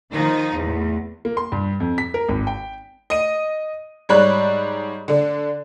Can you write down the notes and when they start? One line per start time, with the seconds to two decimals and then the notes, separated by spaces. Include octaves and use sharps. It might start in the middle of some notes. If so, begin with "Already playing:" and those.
0.13 D#3 F3 D#4
0.57 E2 A2
1.25 A#3
1.37 C6
1.52 G2
1.80 F2
1.98 B6
2.14 A#4
2.29 G#1
2.47 G5
3.10 D#5 D#7
4.09 G#2 G3 C#5 D5 B5 F#6
5.08 D3 D4